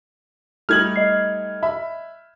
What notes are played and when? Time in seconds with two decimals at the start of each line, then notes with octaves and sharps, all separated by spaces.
0.69 G3 A3 D#4 F6 G#6 F#7
0.96 D#5 C7
1.63 E5 B5